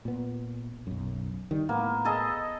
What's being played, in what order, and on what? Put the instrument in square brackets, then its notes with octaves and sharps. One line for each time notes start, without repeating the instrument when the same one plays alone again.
[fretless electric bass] A#2 B3
B1 F#2
D#3 G3
[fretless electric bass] A2 [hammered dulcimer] A#3 B3
[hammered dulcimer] G#4 A4 D#5